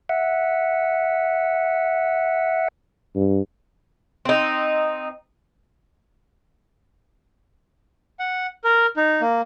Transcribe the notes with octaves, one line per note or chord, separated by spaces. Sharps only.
E5 F#5
G2
C4 D#4
F#5
A#4
D#4
A#3